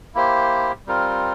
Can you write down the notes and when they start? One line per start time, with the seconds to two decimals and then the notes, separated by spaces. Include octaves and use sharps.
0.15 A#3 E4 G4 C5
0.87 G3 C4 F4 A#4